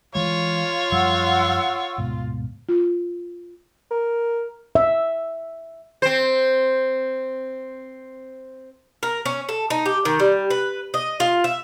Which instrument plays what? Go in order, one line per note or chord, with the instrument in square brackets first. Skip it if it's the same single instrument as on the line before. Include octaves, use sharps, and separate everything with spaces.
[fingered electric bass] E3 G#3 [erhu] F4 [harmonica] C#5
[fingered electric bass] F#2 F3 G3 [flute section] F#5 E6
[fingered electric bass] D1 G#2 B2
[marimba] F4
[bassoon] A#4
[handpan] E5
[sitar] C4 C5
[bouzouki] A#4
C#4
A4
D#4
G4
D#3
G3
B4
D#5
F4
E5